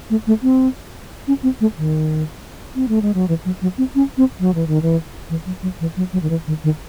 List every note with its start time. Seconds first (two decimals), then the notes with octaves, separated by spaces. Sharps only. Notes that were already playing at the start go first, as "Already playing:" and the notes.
0.10 A3
0.27 A3
0.43 C4
1.28 C#4
1.43 C4
1.61 A3
1.78 D#3
2.75 C4
2.88 A3
3.02 G#3
3.14 F#3
3.28 E3
3.45 F#3
3.62 F#3
3.78 C4
3.95 C#4
4.18 C4
4.40 F#3
4.55 E3
4.67 D#3
4.82 E3
5.30 E3
5.46 F#3
5.63 F#3
5.80 E3
5.97 F#3
6.13 F#3
6.22 D#3
6.30 E3
6.47 D#3
6.64 D#3